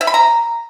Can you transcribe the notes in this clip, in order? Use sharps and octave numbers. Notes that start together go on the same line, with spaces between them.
E5
B5
A#5